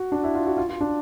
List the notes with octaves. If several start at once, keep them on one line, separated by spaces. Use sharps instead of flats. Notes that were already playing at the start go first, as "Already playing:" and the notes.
Already playing: F#4
D4
E4
F4
F#4
F4
F4
D4